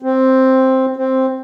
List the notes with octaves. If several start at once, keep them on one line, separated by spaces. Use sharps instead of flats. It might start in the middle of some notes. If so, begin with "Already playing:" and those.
C4
C4